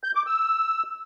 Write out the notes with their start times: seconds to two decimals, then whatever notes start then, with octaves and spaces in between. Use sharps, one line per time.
0.04 G6
0.15 D6
0.27 E6